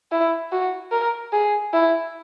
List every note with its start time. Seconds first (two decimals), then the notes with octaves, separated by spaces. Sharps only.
0.12 E4
0.52 F#4
0.92 A#4
1.33 G#4
1.73 E4